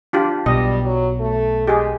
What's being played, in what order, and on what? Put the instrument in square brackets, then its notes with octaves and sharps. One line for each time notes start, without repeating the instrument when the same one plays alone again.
[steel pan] D4 F4 G4
[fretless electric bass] B1 B2 [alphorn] G3 [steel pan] D#5
[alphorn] F#3
A3
[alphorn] G#3 [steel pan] G4 G#4